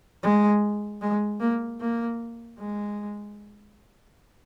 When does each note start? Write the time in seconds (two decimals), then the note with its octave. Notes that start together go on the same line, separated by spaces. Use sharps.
0.23 G#3
1.01 G#3
1.40 A#3
1.80 A#3
2.59 G#3